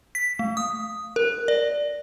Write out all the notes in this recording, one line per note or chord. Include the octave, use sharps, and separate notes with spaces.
B6
A3
D#6
A#4
D5